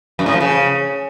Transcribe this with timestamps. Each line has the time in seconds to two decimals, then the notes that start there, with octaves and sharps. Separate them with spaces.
0.19 F#2
0.26 A2
0.33 F3
0.40 C#3